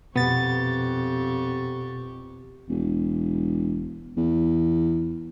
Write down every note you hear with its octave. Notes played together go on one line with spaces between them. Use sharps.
F2 B2 B3 G4 C#6 A6
E1
E2